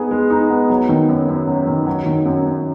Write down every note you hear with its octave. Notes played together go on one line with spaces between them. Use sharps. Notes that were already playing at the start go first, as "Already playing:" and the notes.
Already playing: B3 D#4 G#4
G#3
D#4
B3
F#3
D#3
F#2
F#2
F#3
D#3
F#3
D#3
F#2
F#2